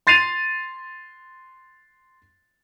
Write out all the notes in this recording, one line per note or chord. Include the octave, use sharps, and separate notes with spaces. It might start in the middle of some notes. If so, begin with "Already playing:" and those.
C6 A6 C7 D#7 F7